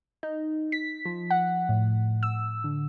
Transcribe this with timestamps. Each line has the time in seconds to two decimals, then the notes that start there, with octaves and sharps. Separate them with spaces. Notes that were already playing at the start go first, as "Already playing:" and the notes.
0.23 D#4
0.72 B6
1.05 F3
1.30 F#5
1.69 A2
2.23 E6
2.64 D3